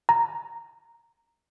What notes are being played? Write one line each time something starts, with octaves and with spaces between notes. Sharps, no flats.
A#5